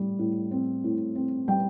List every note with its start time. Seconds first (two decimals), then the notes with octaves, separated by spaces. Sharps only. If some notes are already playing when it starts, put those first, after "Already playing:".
Already playing: A2 G3
0.19 A2
0.51 C4
0.84 A2
1.15 C4
1.48 G3 G5